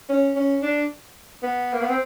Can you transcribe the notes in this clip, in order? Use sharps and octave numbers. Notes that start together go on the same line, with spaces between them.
C#4
C#4
D4
B3
A#3
B3
C4